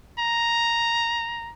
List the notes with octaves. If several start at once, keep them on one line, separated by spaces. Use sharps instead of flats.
A#5